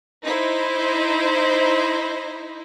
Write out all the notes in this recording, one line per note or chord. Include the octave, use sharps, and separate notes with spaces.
D#4 E4 C5